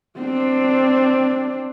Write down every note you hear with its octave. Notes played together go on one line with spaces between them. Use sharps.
C4 D4